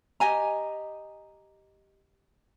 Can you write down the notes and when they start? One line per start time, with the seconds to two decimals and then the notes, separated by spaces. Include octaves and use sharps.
0.20 G4 D#5 G#5 A#5